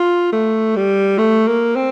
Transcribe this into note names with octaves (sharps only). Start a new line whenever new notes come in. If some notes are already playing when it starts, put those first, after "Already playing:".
Already playing: F4
A3
G3
A3
A#3
C4